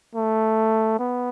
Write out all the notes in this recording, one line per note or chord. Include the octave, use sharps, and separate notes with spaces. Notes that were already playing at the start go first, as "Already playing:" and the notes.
A3
B3